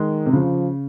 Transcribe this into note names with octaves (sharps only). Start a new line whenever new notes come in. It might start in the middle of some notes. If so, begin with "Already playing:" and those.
Already playing: D#3 G#3
C3
C#3 F3